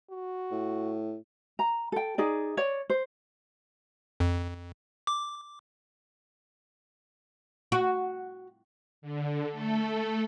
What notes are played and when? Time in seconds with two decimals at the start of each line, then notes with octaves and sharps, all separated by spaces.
0.11 F#4
0.51 A2
1.59 A#5
1.92 A4 G5
2.18 D#4 G#4 D5
2.57 C#5 D5
2.90 C5
4.20 F2
5.07 D6
7.72 F#4
9.02 D3
9.51 A3 A4